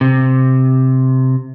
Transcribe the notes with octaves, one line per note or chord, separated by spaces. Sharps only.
C3